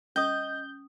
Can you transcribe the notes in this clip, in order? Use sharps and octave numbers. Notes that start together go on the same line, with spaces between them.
C#4 D#5 D#6 G6